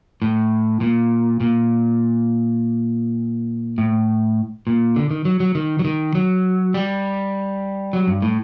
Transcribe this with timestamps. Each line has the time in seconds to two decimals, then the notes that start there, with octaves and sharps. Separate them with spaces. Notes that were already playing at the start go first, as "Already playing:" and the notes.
0.22 A2
0.81 A#2
1.40 A#2
3.78 A2
4.67 A#2
4.96 D3
5.11 D#3
5.25 F#3
5.40 F#3
5.55 D#3
5.79 F#3
5.85 D#3
6.15 F#3
6.74 G3
7.93 F#3
8.07 G2
8.22 A2